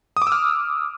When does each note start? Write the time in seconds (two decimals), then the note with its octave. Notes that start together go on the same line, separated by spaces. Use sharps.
0.17 D#6
0.22 D6
0.27 E6
0.32 F6